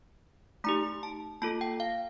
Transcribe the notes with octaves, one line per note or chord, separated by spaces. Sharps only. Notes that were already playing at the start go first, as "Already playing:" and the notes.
A3 D#4 G4 A#5
A5
A#3 F4 A4 A5
G5
F5